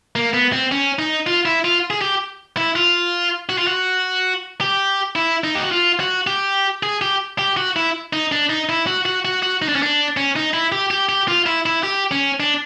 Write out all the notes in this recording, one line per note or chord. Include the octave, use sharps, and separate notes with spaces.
A#3
B3
C4
C#4
D#4
F4
E4
F4
G#4
G4
E4
F4
F#4
F4
F#4
G4
E4
D#4
G4
F#4
F4
F#4
G4
G#4
G4
G4
F#4
E4
D#4
D4
D#4
E4
F#4
F#4
F#4
F#4
D#4
D4
C#4
D4
C#4
D#4
E4
G4
G4
G4
F4
E4
E4
G4
C#4
D4